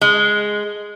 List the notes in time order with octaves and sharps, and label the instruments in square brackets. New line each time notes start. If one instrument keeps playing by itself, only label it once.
[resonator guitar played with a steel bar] G#3